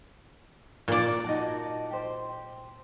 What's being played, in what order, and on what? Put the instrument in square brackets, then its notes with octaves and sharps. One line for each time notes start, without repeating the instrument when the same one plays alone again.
[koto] A#2 D5
[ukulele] D#4 F#4 A5
G4 C5